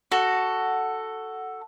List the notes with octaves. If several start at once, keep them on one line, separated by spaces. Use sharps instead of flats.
F#4 A4